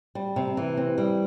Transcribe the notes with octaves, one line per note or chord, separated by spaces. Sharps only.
G3
C3
E3
C4
G3